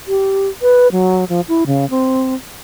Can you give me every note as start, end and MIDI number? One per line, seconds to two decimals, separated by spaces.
0.08 0.49 67
0.62 0.88 71
0.92 1.25 54
1.29 1.41 53
1.48 1.64 64
1.67 1.88 49
1.90 2.34 60